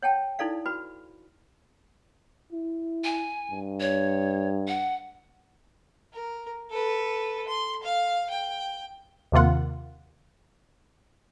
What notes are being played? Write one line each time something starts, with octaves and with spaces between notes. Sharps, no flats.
C#5 F#5 G5 A5
D#4 E4 A4 D5 F5
F#4 B4 B5
E4
G#5
G2
C#5
F#5
A#4
A4 B4
C6
F5
G5
D#2 C3 A#3 F4 F#5